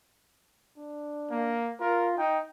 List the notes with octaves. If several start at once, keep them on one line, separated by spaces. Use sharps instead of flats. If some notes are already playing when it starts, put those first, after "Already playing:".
D4
A#3
F4 A#4
D#4 G5